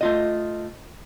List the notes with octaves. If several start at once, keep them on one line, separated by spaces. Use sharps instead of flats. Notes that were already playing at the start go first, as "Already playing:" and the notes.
A3 F4 D#5